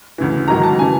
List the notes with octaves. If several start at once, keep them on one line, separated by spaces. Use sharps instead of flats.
D2 C#3 E3
A1 G#2 D#3 F#3 A#5
A5
C#3 E3 G#5